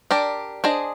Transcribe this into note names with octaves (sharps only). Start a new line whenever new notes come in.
D4 G4 A#4 D5
D4 G#4 C5 D#5